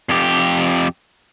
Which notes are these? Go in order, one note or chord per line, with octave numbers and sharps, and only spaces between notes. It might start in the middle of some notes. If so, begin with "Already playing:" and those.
F2 G4